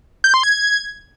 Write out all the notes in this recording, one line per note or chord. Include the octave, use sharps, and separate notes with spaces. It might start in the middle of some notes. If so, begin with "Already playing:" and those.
G6
C6
G#6